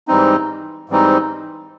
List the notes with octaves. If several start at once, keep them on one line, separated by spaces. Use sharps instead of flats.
G#2 E3 G3 C4 D#4
G#2 E3 G3 C4 D#4